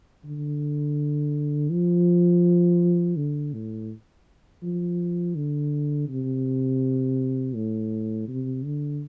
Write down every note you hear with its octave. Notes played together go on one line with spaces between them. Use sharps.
D3
F3
D3
A2
F3
D3
C3
A2
C3
D3